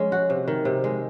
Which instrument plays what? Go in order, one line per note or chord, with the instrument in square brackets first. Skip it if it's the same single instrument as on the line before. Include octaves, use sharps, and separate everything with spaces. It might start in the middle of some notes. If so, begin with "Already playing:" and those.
Already playing: [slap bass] F3 [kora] G#3 C#4
[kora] F#4
C3
D#3
C3
G#3